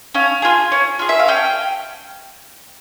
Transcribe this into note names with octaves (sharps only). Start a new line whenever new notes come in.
C#4 F5
F4 G#4
C#4
F4 G#4
E5
F5
C#4 G5